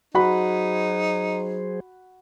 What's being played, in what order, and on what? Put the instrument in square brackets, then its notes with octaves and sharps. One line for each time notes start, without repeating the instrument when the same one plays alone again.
[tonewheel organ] F#3 G#4 C5 [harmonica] D#4 [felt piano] F#4 F#5 B5